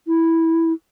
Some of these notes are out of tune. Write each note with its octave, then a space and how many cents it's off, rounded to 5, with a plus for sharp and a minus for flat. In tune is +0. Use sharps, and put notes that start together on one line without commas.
E4 -5